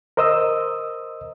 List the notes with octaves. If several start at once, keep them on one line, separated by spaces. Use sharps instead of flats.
A#4 C5 D#5 D#6 E6